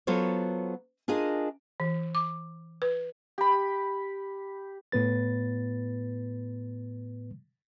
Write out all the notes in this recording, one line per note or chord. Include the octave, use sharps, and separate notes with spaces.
F#3 B3 F4 A4 C5 C#5
D4 F4 G#4 A#4 D#5
E3
D6
B4
G4 B5
A2 B3 B4 A6